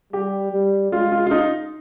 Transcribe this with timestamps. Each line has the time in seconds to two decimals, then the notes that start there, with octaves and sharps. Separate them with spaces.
0.13 G3 G4
0.52 G3
0.92 G#3 F4
1.12 F4
1.26 F4
1.31 D#4